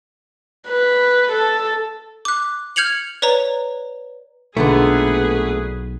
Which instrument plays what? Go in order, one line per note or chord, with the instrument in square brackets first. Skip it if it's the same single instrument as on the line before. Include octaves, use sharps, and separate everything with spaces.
[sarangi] B4
A4
[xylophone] D6 F#6
F6 G6 G#6 C#7 F7 F#7
B4 C#5 D5 A#5
[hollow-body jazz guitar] B1 [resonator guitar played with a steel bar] A#2 D3 B3 [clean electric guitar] A3 [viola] G#4 B4